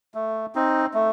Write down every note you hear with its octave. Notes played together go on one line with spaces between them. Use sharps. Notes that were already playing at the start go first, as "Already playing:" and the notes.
A3
C4 D#4
A3